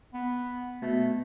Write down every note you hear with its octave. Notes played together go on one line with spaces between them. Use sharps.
B3
B2 A3